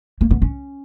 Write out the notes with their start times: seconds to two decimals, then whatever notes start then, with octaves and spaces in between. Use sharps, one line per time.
0.21 A#3
0.31 B3
0.42 C#4